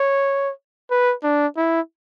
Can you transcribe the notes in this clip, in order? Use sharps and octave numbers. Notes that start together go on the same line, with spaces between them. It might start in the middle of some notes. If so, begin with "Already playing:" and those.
Already playing: C#5
B4
D4
E4